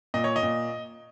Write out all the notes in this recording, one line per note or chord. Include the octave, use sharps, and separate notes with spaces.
A#2 D#5
C#5
D#5
A#2